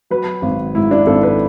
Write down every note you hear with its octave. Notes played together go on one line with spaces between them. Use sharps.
F#3 B4
G#1
G#2 E4
D4
G#1 A4
B4